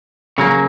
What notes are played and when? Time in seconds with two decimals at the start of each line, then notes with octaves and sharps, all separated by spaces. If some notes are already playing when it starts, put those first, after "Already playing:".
0.38 C#3 F#3 A#3